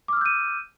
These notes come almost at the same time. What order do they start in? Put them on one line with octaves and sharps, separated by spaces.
D6 F6 E6 G6 D#7